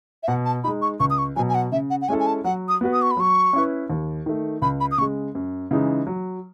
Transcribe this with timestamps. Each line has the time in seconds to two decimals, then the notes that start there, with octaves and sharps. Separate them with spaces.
0.23 E5
0.28 B2 F#5
0.45 A5
0.64 G#3 D#4 B5
0.82 C#6
1.00 C#2 C#6
1.10 D#6
1.18 C#6
1.36 B2 F#3 G#5
1.49 G#5
1.55 F#5
1.72 C#3 E5
1.90 F#5
2.02 F#5
2.09 G#3 C#4 E4 A4 G#5
2.20 G#5
2.27 A5
2.44 F#3 F#5
2.68 D#6
2.81 B3 F#4 B4
2.93 D#6
3.02 C#6
3.11 B5
3.17 F#3 C#6
3.53 C#4 E4 B4
3.90 D#2
4.26 D#3 A3
4.62 C#2 B5
4.80 B5
4.91 D#6
4.98 C#3 G#3 C#6
5.35 F#2
5.71 C#3 E3 G#3 D#4
6.07 F#3